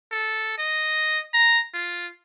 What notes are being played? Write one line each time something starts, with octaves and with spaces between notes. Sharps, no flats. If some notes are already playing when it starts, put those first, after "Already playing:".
A4
D#5
A#5
F4